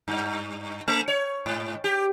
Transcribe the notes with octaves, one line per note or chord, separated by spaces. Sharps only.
G2
A3
C#5
G#2
G4